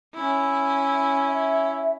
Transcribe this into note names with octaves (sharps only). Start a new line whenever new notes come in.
C#4 E4
E5